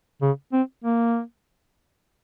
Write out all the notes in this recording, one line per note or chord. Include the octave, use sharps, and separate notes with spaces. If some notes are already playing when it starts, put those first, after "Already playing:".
C#3
C4
A#3